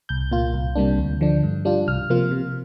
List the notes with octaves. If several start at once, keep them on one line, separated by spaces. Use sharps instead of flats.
C2 G6
A#2 A#3 F4
C2
C3 G3 A#3 D4
D2
D3 F3 D4
G2
G3 D4 F4
C2 F6
C3 F3 A#3 F4
C3